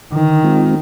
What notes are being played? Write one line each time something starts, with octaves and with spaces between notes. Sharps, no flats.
D3 D#3
G#3 C4 F4